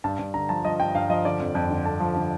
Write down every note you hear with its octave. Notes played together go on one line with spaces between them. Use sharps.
G2 A5
G2
D3 A#5
F3 A5
F3 D#5
G2 G5
G2 F5
F3 D#5
D3 D5
F2
F2
D3
F2 A5
F3
D3